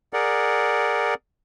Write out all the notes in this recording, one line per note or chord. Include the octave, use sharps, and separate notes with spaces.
G#4 A#4 D5 F#5